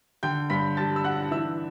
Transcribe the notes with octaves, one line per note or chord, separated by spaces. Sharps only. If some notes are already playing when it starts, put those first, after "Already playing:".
D3 G5 G6
G2 B5 B6
G3 A5 A6
E6
D4 F#5 F#6
E3 E5 E6